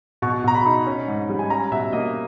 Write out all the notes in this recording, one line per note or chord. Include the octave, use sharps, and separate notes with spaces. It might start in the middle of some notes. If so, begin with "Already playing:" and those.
B2 C#6
B2 A#5
B5
D#4
C#4
G#2
G3
G#5
C#4 A#5
B2 E5
A#3 D#5